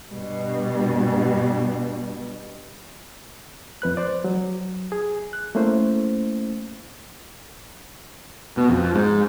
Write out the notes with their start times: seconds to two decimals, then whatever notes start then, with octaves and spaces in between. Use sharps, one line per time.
0.12 G2 B2 G3
3.82 F2 B4 F#6
3.97 C5 D5
4.24 F#3
4.92 G#4
5.33 F#6
5.55 A3 A#3 C#4 E4 C5
8.57 B2
8.70 F2
8.94 G#2